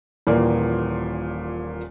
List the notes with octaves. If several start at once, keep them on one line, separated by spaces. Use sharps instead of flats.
D#1 A#2 E3 A#3 D5